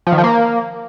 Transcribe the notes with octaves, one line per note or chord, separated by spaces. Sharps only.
F3
D#3
F3
A#3